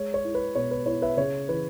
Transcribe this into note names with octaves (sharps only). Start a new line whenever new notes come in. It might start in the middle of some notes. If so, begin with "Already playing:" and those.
Already playing: G#3 C#5
C#5
E4
B4
B2 C#5
B4
E4 C#5
B4 E5
C#3 C#5
E3 B4